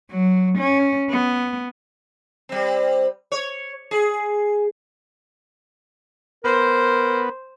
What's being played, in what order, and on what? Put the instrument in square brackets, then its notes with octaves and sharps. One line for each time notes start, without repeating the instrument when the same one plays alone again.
[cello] F#3
C#4
B3
[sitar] G3 C4
C#5
G#4
[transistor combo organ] B3 [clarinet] A#4 [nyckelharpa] C5